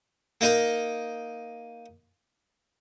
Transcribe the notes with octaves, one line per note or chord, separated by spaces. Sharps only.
A#3 D#4 A#4